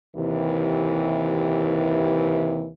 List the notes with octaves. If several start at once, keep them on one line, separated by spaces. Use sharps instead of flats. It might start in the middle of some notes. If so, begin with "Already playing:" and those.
D#2 C3 E3